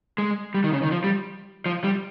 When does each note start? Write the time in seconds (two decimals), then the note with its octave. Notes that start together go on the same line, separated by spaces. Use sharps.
0.18 G#3
0.54 G3
0.64 D#3
0.73 C#3
0.83 D#3
0.91 F3
1.04 G3
1.66 F3
1.84 G3